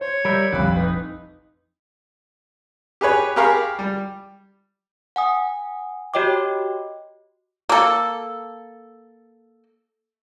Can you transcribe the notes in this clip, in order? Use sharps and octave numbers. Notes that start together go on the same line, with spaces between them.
C5 C#5
G3 A#4 E5 B5 G6
F1 A#1 G3 F5 B5 F#6
D#4 B4
G4 G#4 B4 C#5
G4 G#4 A#4 F5 B5 C#6
G3
F#5 G#5 D#6
F#4 G4 C#5 D#5 G5 D6
A#3 A4